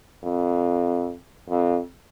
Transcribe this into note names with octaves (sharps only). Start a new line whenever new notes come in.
F2
F2